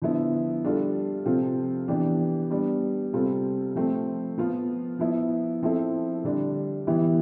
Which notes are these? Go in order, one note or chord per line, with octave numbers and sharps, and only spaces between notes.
D3 F3 B3 E4
G3 D4 F4 A4
C3 F3 C4 F4 A4
E3 B3 D4 G4
G3 B3 D4
C3 G3 C4 F4 A4
F3 A3 C4
F3 B3 F4
F3 B3 E4
F3 C4 E4 A4
D3 G3 D4
E3 B3 E4 G4